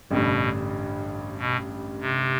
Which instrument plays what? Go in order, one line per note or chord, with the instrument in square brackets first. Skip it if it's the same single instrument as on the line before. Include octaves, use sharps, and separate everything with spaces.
[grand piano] A1 G2 D3 G3 [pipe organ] B2
[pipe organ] B2
C3